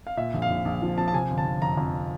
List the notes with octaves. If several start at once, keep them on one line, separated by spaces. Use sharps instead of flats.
F5
A#2 E5
A#1
F5
A#1
A#1
F3
F3 A5
A5
C3 G#5
G1
A5
G1
F2 A#5
F2